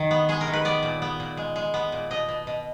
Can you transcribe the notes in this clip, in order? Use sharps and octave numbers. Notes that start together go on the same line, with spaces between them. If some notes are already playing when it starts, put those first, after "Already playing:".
Already playing: D#3
B3
G#3 G#4
A#4
D#3
B4
B3 D5
A#2
B3
A#2
G#3
G#3
B3
A#2
B2 D#5
B2
B2